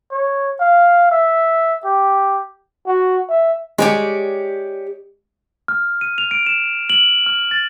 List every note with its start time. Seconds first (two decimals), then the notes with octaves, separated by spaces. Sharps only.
0.12 C#5
0.60 F5
1.11 E5
1.85 G4
2.87 F#4
3.29 E5
3.78 G#3 G4 C#5 D5
5.68 F6
6.01 D#7
6.18 F7
6.31 D7
6.46 E7
6.90 F#7
7.26 F6
7.51 A6